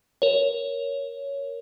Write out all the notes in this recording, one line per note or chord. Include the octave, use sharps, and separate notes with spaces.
A#4 C#5